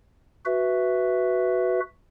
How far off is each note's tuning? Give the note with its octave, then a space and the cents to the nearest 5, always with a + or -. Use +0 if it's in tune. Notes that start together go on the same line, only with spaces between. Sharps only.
F#4 +5 B4 +0 E5 +0